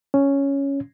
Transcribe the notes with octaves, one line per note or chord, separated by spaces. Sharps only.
C#4